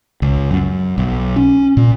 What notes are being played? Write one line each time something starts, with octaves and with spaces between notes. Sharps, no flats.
C#2
F#2
B1
C#4
A#2